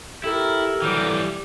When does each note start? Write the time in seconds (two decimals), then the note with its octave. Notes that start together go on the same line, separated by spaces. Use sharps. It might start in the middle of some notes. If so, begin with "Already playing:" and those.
0.24 E4 G4 A4 A#4
0.82 E3 F#3 G3
1.11 G4